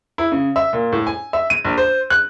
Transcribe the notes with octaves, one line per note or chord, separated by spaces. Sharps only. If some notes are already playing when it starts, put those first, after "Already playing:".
E4
C#3
E5
A#2
A2
G#5
E5
D#7
A#1
C5
F#6